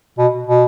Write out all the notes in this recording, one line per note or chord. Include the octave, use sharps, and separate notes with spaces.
B2
B2